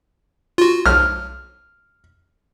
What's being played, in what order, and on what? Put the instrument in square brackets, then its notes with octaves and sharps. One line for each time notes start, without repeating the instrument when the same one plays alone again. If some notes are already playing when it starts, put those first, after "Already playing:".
[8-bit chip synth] F4 F#4
[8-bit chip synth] B1 [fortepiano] F6